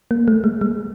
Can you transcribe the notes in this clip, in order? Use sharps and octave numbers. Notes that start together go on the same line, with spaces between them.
A#3
A3
G#3
G#3